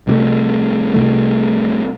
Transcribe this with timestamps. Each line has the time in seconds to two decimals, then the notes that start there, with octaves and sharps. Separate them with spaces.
0.07 C2 C3 E3 A3
0.94 C2 C3 E3 A3